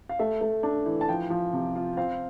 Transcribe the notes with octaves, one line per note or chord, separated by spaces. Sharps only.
F5
A3 E5
A3
D4
E3
A5
F3 G5
F3
C3
F4
C4 F5